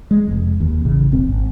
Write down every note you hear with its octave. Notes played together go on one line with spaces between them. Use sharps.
G#3
F1 F2
D#2
A1 C#3
E1 C4
G#1